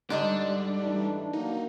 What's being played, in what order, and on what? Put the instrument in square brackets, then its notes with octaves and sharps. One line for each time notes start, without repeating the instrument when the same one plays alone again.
[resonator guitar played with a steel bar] G#2 D3 D#5 [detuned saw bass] G3 [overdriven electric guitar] D4
[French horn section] E3 A3 D#4
[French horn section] D#3 F#3 A#3 [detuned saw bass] D#4